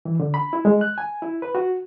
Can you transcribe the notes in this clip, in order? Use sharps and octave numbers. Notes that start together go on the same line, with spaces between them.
E3
D3
B5
E4
G#3
F#6
G#5
E4
B4
F#4